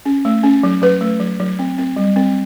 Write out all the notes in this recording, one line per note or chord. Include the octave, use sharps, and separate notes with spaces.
C#4
A3
C#4
F#3
F#3 B4
A3
F#3
F#3
C4
C4
G3
C4